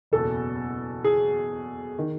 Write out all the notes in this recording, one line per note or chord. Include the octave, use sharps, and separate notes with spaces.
F#1 E2 B2 A4
G#4
D#3